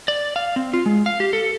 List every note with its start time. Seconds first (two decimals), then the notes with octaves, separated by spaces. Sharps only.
0.08 D5
0.36 F5
0.56 C4
0.73 F4
0.86 G#3
1.06 F5
1.20 G4
1.33 A4